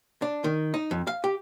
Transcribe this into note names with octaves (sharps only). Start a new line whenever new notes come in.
D4
D#3
D#4
F2
F5
G4